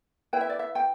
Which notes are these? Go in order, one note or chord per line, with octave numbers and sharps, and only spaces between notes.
E4 B4 G5
E5
D5
E5
G5